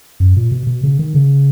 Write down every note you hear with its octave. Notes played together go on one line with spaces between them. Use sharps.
F#2
A#2
B2
B2
C#3
D#3
C#3